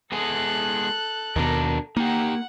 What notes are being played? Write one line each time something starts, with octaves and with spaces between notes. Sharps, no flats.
G#3 B3 G#4 A4 F#6
D#2 B2 D4 A#4
A#3 D#4 G4 F#5